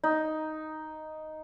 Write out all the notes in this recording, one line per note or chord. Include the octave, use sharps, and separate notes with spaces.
D#4